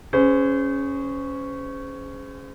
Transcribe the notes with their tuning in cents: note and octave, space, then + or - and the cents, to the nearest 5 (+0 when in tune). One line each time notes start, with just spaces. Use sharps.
C#4 +0 G#4 +0 C5 -35